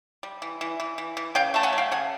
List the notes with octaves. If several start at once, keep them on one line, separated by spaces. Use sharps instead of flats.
G3
E3
E3
E3
E3
E3
C#3 F5 G5
A3 A5
F#5 G#5
F#3
F5 G5
C#3 F#5 G#5